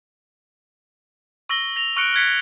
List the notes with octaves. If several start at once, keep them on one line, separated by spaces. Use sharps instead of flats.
C#6 E6 A#6 G7
A#6 F7
C#6 F6 F#6 C#7 D7
F6 F#6 G#6 B6 C#7